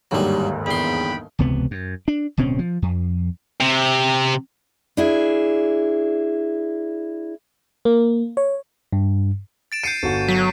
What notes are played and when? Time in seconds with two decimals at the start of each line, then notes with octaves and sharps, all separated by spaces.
0.11 G1 D#2 G#2 F#3 G3
0.66 E2 B3 G5 B5 C6
1.39 E1 C#2 C3 B3
1.71 F#2
2.08 D4
2.37 D1 B2 C4 C#4
2.59 F3
2.82 F2
3.61 C3
4.97 D4 E4 G#4
7.85 A#3
8.37 C#5
8.93 G2
9.72 A6 D7 E7
9.84 G6 C7 C#7 D#7
10.03 G1 F#4
10.28 F#3 B6